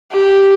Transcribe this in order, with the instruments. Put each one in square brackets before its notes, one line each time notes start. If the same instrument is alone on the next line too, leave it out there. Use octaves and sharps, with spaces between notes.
[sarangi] G4